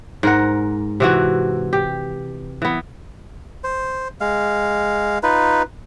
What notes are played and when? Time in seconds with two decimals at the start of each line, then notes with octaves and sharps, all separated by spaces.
0.23 G#2 A#4 F#5
1.00 C3 E3 F#4
1.73 G4
2.62 E3 B3
3.64 C5
4.21 G#3 F5
5.23 D#4 F4 B4